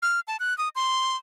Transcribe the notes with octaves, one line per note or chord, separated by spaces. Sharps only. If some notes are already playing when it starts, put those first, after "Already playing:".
F6
A5
F#6
D#6
C6